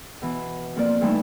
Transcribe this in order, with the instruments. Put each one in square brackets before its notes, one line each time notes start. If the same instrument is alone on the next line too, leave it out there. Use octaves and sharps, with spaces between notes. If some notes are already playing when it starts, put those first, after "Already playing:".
[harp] B2 E3
F2 F3 A#3 D5
G2 E3 G3 A3 D#4 E4